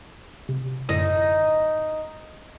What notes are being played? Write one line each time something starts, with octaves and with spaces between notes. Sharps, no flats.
C3
F#2 A2 D3 D#4